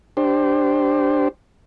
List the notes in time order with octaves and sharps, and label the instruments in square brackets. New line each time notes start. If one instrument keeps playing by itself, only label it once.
[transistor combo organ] D4 G4 C5